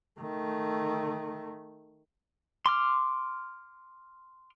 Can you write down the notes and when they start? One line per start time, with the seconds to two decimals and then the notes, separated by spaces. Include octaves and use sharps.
0.20 D#3 A3
2.66 C6 D6 F6